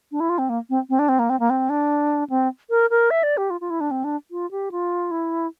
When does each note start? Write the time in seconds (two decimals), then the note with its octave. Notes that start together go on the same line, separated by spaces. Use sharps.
0.12 D4
0.20 E4
0.30 F4
0.38 C4
0.49 A#3
0.70 C4
0.89 C4
0.99 D4
1.09 C4
1.19 A#3
1.30 C4
1.40 A#3
1.50 C4
1.70 D4
2.30 C4
2.70 A#4
2.90 A#4
3.11 E5
3.23 D5
3.37 G4
3.50 F4
3.61 F4
3.70 E4
3.81 D4
3.91 C4
4.04 D4
4.31 F4
4.51 G4
4.72 F4
5.11 E4